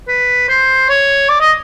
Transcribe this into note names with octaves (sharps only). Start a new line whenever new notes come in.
B4
C5
C#5
D5
D#5